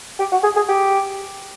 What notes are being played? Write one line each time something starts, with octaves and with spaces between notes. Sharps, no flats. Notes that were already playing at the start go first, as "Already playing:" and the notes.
G4
F#4
G#4
G#4
G4